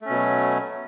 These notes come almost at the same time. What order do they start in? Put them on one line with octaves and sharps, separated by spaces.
A3 C#4 B2 F#3